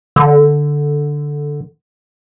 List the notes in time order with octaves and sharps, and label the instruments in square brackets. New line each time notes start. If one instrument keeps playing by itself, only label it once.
[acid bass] D3